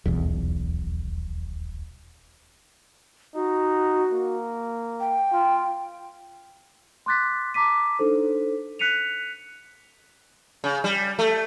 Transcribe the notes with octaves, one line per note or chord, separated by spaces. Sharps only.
D#1 B1 E2
D#4 F#4
A#3
G5
F4
C6 D6 F#6 A6 B6
A5 A#5 D6 B6 D#7
D4 D#4 A4 C5
F#6 B6 C#7 D#7 F7
C#3
G3
A3